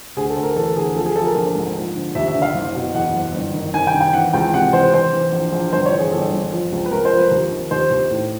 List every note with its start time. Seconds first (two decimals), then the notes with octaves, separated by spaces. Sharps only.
0.16 D2 G#4
0.30 A4
0.36 D2
0.43 A#4
0.56 E3 A4
0.76 D2 G#4
0.96 F3 A4
1.06 G#4
1.16 F3 A4
1.26 A#4
1.36 A#1
1.55 G#2
1.76 F3
1.95 D3
2.15 D#2 E5
2.28 E5
2.35 D3
2.42 F5
2.55 F#1
2.75 B2
2.95 E2 F#5
3.14 F#1
3.34 G1
3.54 D#3
3.74 D#3 G#5
3.87 G5
3.94 D#3
4.01 G5
4.13 E3 F#5
4.33 C#2 G5
4.54 C3 F#5
4.73 E3 C5
4.93 E3 C5
5.13 E3
5.32 A#1
5.52 A#1
5.73 G1 C5
5.86 C#5
5.92 E3
5.99 G#4
6.12 G1 A4
6.32 G1
6.52 F3
6.72 C#2
6.86 B4
6.92 C#2 A#4
7.05 C5
7.12 F3
7.18 B4
7.31 D#2
7.51 D#3
7.71 D#2 C5
7.91 D#2
8.11 A2